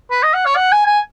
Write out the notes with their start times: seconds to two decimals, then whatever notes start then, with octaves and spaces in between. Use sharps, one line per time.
0.11 B4
0.23 D#5
0.34 F#5
0.45 C#5
0.56 F#5
0.72 G#5
0.86 G#5